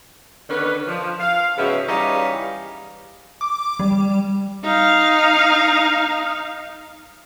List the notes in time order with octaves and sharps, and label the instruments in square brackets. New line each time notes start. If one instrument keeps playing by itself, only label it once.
[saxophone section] D3 D#3 B3 C#4 D4 B4
F3
F5
G#2 C#3 F3 B3 F#4 E5
E3 G3 C#4 D#4 F5
[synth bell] D6
G3
[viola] D#4 F5